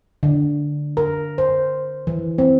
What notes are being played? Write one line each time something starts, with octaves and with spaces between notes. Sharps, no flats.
D3
A#4
C5
E3
C4